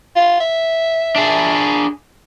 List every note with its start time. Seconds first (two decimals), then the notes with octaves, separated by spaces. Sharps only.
0.15 F4
0.40 E5
1.16 D4 G#4